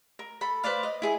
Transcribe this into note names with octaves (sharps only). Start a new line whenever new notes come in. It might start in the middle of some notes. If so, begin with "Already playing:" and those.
A#4
A4 B5
B4 C5 D5 F5
D#5
E4 G#4 G#5